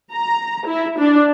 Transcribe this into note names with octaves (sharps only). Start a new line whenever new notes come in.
A#5
E4
D4